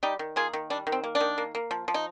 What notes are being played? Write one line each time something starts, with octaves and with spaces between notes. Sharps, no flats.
G3 D#4 G4
D#3
A#3 F4 G#4
D#3
G3 D4
D#3
C4
A#3
D4
D#3
A#3
A#3
F3
F3
D#4